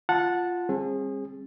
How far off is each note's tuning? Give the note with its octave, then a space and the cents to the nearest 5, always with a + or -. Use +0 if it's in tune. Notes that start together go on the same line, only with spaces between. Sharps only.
F4 +0 F#5 -15 A5 +0
G3 +40 C4 +40 G#4 -20